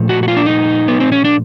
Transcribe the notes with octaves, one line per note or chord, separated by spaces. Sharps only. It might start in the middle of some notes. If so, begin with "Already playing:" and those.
Already playing: A#2 F3 A3
F#4
F#4
F4
D4
D#4
B3
C4
C#4
D4